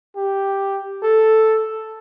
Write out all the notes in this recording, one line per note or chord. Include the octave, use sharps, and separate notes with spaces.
G4
A4